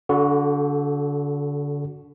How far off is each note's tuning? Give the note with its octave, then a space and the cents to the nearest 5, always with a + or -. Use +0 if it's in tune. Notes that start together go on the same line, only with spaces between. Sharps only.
D3 -30 F#4 +0 A4 +0